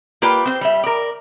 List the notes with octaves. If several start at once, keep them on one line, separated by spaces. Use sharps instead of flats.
A#3 F4 G4 B4 D5 G5
C4 C5
G3 E5
A#4 D5